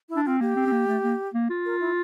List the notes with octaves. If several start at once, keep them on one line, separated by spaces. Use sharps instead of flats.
E4
D4
C4 F4
A#3 G4
C4
C4
A#3
A3
A#3
A#3
F4
A#4
E4